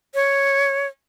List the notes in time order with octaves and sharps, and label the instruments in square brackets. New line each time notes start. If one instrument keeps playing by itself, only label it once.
[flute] C#5